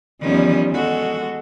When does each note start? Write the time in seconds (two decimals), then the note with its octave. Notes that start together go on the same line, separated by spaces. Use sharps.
0.22 E2 D#3 F3 G3 C#4
0.74 G#3 F#4 A4